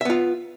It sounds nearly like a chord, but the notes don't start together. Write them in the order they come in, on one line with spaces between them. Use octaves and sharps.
E5 B3 F4